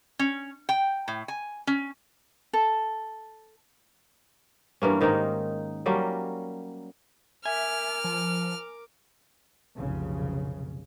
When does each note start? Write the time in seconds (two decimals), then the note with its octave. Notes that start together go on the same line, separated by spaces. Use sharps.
0.19 C#4
0.69 G5
1.08 A2
1.28 G#5
1.67 C#4
2.53 A4
4.82 G2 E3 A#3 C#4
5.01 G#2 D#3 A#3 D#4
5.86 F#3 G3 A#3 C#4
7.45 A#4 E5 G#5 D6 F6
8.04 F3
9.77 F1 B1 C#3